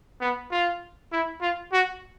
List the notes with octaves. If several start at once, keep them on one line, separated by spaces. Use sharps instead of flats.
B3
F4
E4
F4
F#4